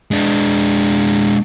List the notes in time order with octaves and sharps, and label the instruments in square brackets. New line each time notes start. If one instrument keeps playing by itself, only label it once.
[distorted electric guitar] G#3 D4